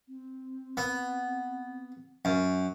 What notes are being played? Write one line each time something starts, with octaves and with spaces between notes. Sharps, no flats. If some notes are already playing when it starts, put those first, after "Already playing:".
C4
B3
F#2